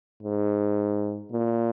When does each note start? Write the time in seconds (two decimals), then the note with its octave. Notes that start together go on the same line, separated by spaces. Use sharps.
0.22 G#2
1.31 A#2